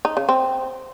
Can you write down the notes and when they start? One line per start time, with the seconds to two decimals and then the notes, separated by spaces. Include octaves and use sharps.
0.05 D#4
0.17 C#3
0.29 C4